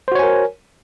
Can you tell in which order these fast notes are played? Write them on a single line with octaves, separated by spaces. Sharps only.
C5 F#4 C#5 G#5 A#4